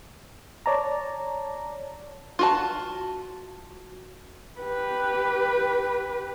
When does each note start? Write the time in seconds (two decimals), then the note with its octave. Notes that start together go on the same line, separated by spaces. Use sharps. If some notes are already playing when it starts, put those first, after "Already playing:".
0.66 C#5 D5 A5 A#5
2.39 F4 F#4 A5
4.60 G4 B4